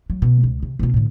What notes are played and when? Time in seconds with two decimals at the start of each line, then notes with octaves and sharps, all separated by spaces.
0.10 F#3
0.22 B2
0.43 C#2
0.63 C3
0.79 B2 F4
0.94 A2 D3